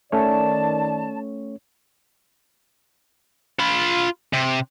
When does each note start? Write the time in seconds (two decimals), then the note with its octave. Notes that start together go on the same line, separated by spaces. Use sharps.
0.12 D#3 A3 C#4 C#5 D5 A5
3.59 F4 B5
4.33 C3